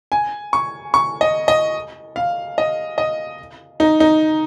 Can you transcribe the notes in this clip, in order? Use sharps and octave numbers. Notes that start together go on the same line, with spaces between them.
G#5
C#6
C#6
D#5
D#5
F5
D#5
D#5
D#4
D#4